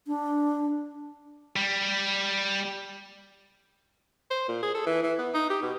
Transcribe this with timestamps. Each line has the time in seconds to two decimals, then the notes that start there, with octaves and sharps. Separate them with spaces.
0.07 D4
1.56 G3
4.31 C5
4.49 A#2
4.63 G#4
4.74 A4
4.86 E3
5.03 E3
5.19 B3
5.34 D#4
5.50 G4
5.62 B2